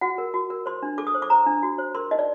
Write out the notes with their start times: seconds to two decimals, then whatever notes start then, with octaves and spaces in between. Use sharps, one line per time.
0.01 F#4 F#5
0.18 A#4
0.34 F#4
0.50 A#4
0.66 C5 C6
0.83 D4
0.98 A4 D6
1.07 D#6
1.14 C5
1.22 D6
1.30 C5 A#5
1.46 D4
1.63 F#4
1.78 C5
1.95 A#4 C6
2.11 D#4 D#5
2.19 D5